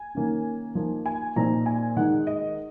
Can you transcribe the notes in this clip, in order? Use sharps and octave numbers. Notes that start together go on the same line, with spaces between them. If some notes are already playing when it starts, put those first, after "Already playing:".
Already playing: G#5
D#3 A#3 C#4
F3 A#3 D#4
G#5
A#2 F3 C4 D#4 A#5
G#5
D#3 G#3 D#4 F#5
D#5